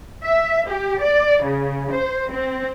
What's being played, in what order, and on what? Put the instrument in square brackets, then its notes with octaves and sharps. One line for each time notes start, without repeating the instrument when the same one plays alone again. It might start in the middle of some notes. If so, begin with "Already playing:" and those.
[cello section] E5
G4
D5
C#3
C5
C4